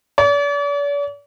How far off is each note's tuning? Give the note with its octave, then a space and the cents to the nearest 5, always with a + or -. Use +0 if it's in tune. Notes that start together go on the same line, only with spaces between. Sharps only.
D5 -45